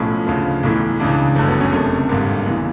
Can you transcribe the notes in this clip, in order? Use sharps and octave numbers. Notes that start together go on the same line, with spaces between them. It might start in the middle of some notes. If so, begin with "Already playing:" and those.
Already playing: B1 A2 F3 C#4
D2 C#3 F3
B1 A2 E3
C#2 C#3 E3 D4
G1 F#2 D3 A3
B3
C#4
F#1 F2 C3 A3
G#1 G2 D3 A#3
E2 C#3 E3